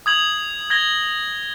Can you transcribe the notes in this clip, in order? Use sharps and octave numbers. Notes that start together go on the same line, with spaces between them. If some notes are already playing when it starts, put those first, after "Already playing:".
D#6 G#6 F#7
G#6 A#6 G7